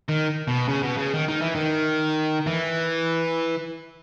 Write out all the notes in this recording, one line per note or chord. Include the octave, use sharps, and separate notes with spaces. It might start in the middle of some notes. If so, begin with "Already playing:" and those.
D#3
B2
C#3
B2
C#3
D#3
D#3
E3
D#3
E3